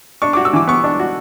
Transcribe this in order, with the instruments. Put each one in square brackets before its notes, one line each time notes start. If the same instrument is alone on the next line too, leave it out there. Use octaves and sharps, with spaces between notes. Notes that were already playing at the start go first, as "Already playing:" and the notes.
[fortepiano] D4 [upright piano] C#6
[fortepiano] F#4 [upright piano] D6
[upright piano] E6
[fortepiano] E3 [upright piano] D6
[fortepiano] B3 [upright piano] C#6
[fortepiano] D4
F#4